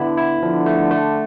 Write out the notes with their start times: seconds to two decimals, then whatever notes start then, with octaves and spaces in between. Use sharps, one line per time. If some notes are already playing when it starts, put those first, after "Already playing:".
Already playing: D3 B3 E4
0.17 E4
0.42 D3 F3
0.66 A3
0.90 A3